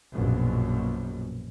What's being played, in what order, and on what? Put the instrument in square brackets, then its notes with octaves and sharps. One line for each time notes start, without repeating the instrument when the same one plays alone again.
[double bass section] A#1 F#2 B2